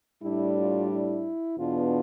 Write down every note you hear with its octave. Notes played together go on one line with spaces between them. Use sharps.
A2 G3 D4 E4
F4
E4
E2 B2 B3 D4 F4